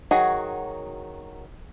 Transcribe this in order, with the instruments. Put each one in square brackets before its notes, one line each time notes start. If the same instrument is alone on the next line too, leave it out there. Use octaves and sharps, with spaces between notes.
[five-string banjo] D#3 F#3 F#4 G#4